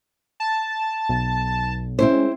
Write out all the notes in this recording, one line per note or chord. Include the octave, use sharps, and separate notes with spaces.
A5
B1
G#3 C4 C#4 E4 G#4 C5